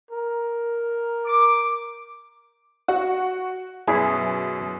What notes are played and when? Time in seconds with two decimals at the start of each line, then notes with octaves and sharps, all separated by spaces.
0.11 A#4
1.26 D6
2.88 F#4
3.87 F#2 B2 E4 G#4 G#5